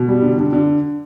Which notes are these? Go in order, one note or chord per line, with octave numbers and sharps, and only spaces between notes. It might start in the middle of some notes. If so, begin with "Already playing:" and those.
Already playing: B2
G3
D3
D3
D3